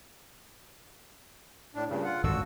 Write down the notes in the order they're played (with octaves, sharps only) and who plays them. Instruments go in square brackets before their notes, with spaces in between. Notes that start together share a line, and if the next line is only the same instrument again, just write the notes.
[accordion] A2 D4
G2 A#2 C#3
F4 F#5
[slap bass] G#1 F#2 D3 [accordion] F#4 A4 E6